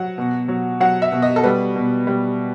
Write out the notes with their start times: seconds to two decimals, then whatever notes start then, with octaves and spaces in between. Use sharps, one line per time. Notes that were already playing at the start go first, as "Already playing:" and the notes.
Already playing: F#3 F#5
0.18 B2
0.48 F#3
0.80 F#3 F#5
1.02 E5
1.12 B2
1.22 D#5
1.36 A4
1.44 G3 B4
1.76 B2
2.07 G3